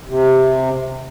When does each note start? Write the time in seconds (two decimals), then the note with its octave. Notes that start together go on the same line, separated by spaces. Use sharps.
0.08 C3